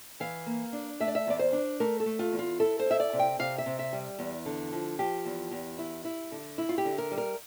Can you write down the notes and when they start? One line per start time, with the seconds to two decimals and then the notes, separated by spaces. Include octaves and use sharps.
0.20 E3 F5
0.46 A#3
0.73 D4
1.00 A3 E5
1.08 D5
1.15 E5
1.27 E2 D5
1.39 C5
1.52 D4
1.80 A3 A#4
2.00 A4
2.06 A3
2.19 F4
2.32 E2
2.39 F4
2.59 E4 A4
2.79 C5
2.86 E4 E5
3.00 D5
3.13 C3
3.19 G5
3.39 C3 F5
3.58 E5
3.66 C3
3.79 E5
3.93 G3
4.19 E2
4.46 D3
4.72 F3
4.99 F3 G4
5.25 E2
5.51 E2
5.78 E4
6.05 E4
6.32 D3
6.58 E4
6.69 F4
6.78 G4
6.85 D3
6.98 A#4
7.11 G3
7.18 A#4